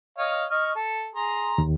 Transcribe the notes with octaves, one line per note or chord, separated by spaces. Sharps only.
C#5 D#5 F5
D#5 C#6 F6
A4
G#4 A#5 C6
D#2